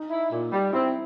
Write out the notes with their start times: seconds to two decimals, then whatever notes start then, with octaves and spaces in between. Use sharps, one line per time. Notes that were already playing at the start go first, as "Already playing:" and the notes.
Already playing: D#4
0.10 E4
0.31 A#2
0.52 G3
0.73 C4 E4